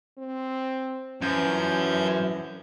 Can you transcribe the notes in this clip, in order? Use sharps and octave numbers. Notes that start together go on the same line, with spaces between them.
C4
F#2 E3 F3 G6 G#6